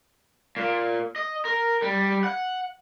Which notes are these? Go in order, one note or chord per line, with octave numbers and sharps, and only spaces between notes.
A#2
D#5
A#4
G3
F#5